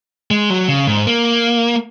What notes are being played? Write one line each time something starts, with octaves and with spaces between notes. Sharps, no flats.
G#3
F#3
C#3
G#2
A#3